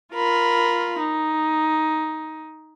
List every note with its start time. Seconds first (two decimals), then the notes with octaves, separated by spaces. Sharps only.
0.13 F4 A#4 B5
0.99 D#4